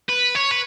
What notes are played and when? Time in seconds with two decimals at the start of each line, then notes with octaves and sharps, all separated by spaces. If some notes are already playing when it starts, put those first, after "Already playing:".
0.09 B4
0.35 C#5
0.51 B4